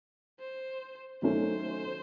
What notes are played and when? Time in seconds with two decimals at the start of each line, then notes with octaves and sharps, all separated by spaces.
0.40 C5
1.22 D#3 F#3 A3 C#4 C5